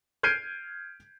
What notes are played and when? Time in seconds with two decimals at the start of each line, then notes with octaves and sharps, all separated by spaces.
0.23 F6 G6 G#6 C7 D7 D#7